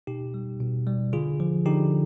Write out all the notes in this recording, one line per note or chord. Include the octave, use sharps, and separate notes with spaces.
B2 D#4 G4
G3
B2
G3
D3 F4 G#4
F3
D3 D#4 G4